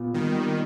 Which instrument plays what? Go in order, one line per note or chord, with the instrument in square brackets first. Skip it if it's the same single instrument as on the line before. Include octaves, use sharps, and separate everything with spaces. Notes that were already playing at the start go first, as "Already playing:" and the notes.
Already playing: [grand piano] A#2 B3
[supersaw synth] D#3 [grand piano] G3
[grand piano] G4